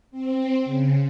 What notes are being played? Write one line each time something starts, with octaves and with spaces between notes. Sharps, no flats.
C4
C#3